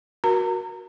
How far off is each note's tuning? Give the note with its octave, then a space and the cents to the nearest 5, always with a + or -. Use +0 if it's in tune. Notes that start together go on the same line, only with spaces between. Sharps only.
F#4 +0 A#4 +20 A#5 -35